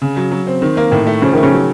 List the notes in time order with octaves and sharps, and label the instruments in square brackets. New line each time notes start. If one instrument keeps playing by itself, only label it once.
[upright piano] C#3
F#3
F#3
C4
D#3
A#3
[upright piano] A2 [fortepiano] D#3
[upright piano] A3
[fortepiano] C#3 [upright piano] F3
[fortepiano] D#3 [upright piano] A3
[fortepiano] C#3
[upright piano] F#3